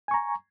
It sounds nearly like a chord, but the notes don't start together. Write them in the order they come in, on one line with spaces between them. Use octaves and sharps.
G#5 C#6 A#5